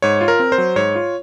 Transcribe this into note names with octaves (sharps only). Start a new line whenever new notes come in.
G#2 C#5
F4
A#4
C4
C5
F#3
G#2 C#5
F4